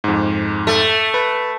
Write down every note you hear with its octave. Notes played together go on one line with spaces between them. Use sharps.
F2 G#2
A3
B4